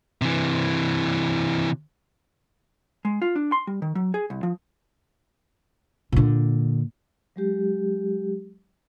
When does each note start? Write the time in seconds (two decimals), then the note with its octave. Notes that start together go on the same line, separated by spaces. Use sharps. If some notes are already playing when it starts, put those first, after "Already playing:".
0.22 C3 E3
3.05 G#3
3.22 F4
3.36 D4
3.52 C6
3.67 G3
3.82 D#3
3.95 F#3
4.14 G#4
4.30 C2
4.43 F3
6.12 A#2 D3
7.36 F#3 G#3 G4